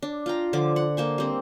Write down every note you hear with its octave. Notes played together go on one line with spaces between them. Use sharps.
D4
F4 G5 A#5
D3 F3 D6
F#5
A#3 C5 G#5
G3 C4